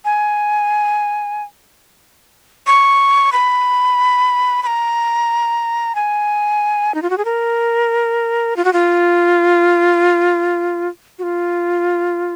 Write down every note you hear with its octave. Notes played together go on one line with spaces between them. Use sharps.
G#5
C#6
B5
B5
A#5
G#5
D#4
F4
F#4
G#4
A#4
F4
F#4
F4
F#4
F4